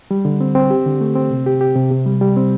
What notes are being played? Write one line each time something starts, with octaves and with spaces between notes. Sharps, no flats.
G3
D3
C4
C4
G4
D3
A3
C4
C3
G4
G4
C3
C3
G3
G3
C4